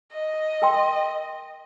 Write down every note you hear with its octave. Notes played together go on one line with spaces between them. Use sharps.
D#5
A#4 G5 C6